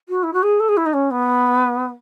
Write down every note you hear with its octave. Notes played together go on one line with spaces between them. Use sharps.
F#4
E4
F#4
G#4
A4
G#4
E4
D#4
C#4
B3